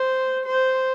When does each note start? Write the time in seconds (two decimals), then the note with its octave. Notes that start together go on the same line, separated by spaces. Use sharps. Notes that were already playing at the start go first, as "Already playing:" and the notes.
Already playing: C5
0.45 C5